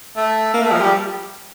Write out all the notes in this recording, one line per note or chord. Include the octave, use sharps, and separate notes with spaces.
A3
A#3
A3
F3
G3